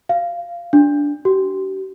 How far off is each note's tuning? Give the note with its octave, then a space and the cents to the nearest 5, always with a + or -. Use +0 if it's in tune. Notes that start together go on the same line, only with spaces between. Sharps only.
F5 -15
D4 -10
G4 -45